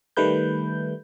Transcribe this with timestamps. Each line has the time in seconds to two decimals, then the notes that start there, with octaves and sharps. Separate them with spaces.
0.17 D#3 G3 A3 B4 G6